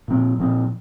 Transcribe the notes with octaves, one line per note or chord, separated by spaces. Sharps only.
A#2 F3 C4
A#2 F3 C4